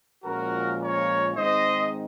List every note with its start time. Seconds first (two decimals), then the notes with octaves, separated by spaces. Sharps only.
0.24 A#2 F3 G#3 C#4 F#4 A#4
0.81 A#4 C#5
1.36 G#2 D#3 G#3 C4 D#4 C5 D#5